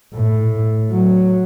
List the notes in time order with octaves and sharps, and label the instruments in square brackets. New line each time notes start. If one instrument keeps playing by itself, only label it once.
[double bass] A2
F#3